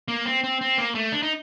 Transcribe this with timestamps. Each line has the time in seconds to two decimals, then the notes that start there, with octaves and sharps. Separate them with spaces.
0.08 A#3
0.26 C4
0.44 C4
0.61 C4
0.78 A#3
0.95 A3
1.12 D4
1.23 D#4